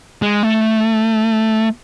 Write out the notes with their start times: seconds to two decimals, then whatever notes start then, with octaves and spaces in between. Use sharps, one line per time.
0.22 G#3
0.43 A3